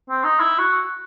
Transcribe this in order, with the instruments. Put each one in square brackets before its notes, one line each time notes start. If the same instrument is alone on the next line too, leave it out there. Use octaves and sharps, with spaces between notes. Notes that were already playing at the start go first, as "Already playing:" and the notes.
[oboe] C4
D#4
E4
F#4